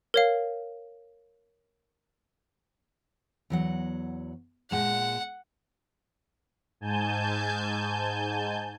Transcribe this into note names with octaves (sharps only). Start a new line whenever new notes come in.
A#4 C#5 F5
E2 F#3 F#5
A#2 G#3 F#5 A5
G#2 G#5 A5 G6